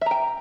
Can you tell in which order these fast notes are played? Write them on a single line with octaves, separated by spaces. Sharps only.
E5 A#5 G5